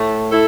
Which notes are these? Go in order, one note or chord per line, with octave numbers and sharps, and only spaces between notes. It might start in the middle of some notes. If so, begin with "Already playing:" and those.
Already playing: A2 A3
E4 A4